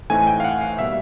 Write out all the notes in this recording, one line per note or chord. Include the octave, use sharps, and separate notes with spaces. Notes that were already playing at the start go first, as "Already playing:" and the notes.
A2 E3 A3 C4 D#4 G#5
G5
F5
F#5
F5
B2 G3 A#3 E5